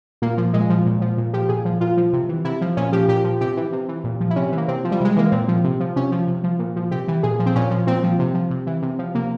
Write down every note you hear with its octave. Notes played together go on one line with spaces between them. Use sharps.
A#2 A#3
F3
A#2 G#3
F3
A#2
F3
A#2
F3 G4
A#2 G#4
F3
A#2 F4
F3
C3
E3
C3 E4
F3
A#2 C#4
F3 G4
A#2 G4
F3
C3 G4
E3
C3
E3
A#2
F3
E4
C3 C#4
E3
A#3
C3 C4
F3
G3
C3 G#3
E3 A#3
A#2 C4
F3
C3
F3
C3 C#4
F3
C3
F3
A#2
F3
C3 G4
E3
A#2 G#4
F3
C4
A#2 C#4
F3
A#2 C4
F3
C3
F3
C3
E3
C3
F3
C3 A#3